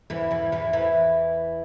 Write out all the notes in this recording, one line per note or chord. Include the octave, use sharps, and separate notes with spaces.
E2 E3
E2 E3
E2 E3
E2 E3